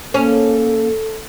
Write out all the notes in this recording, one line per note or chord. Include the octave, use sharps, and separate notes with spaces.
A#3 C#4 A4